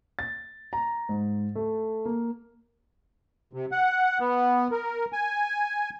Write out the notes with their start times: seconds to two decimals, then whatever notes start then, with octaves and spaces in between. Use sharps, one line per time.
0.19 A6
0.73 A#5
1.09 G#2
1.56 A3
2.05 A#3
3.53 C3
3.72 F#5
4.20 B3
4.72 A#4
5.13 G#5